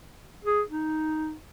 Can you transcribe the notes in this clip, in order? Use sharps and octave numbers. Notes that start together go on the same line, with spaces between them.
G#4
D#4